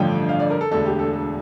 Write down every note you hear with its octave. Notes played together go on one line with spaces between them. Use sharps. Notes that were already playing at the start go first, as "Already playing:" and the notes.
Already playing: A1 G2 D3 F3 G5
F5
D5
A#4
A4
E1 D2 D3 A4
G4
A4
A4